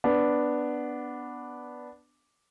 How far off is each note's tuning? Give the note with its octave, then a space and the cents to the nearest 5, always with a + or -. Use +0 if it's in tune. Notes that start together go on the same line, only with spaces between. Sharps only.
B3 +0 D4 +0